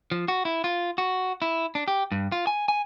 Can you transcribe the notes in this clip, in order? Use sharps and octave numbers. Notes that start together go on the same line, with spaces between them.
F3
F#4
E4
F4
F#4
E4
D4
G4
G2
F4
G#5
G#5